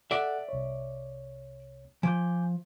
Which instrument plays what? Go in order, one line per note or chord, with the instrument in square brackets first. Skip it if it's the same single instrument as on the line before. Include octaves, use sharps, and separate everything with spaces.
[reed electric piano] A4 F#5 [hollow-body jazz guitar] D5 E5
[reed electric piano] C2 C#5
[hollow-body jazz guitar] F3 [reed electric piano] G#5 D6 G6